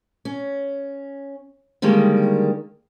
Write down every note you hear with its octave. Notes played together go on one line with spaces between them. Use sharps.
C#4
D3 D#3 G3 G#3 A#3